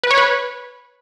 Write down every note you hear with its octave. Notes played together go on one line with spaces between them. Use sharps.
B4
C#5
B4